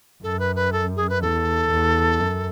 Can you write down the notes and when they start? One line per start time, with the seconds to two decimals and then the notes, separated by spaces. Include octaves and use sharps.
0.23 F#2 A4
0.39 B4
0.56 B4
0.72 A4
0.97 G#4
1.09 B4
1.22 E2 A4
1.70 E2
2.20 F#2